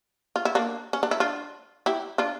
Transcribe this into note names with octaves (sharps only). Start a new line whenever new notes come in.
F4
E4
A#3 D4
C#4
D4
E4
D4 F4
E4 G4
D4 F4